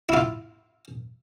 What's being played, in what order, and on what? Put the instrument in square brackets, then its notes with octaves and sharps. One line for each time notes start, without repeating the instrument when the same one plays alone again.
[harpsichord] E4 F4